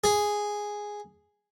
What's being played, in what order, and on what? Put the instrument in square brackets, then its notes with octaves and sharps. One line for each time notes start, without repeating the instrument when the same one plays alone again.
[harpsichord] G#4